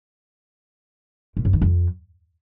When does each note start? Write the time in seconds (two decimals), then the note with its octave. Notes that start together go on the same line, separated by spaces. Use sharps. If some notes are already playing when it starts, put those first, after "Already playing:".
1.37 A#2
1.45 F#2
1.53 D#3
1.62 F2